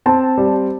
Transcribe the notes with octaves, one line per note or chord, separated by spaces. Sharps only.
C4 A5
G3